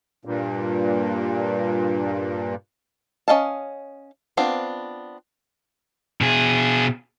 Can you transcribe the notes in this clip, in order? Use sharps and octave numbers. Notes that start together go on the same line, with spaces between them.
G2 A#2
C#4 A4 D#5 F5 A5
B3 C4 D4 F4 C5
B2 G#4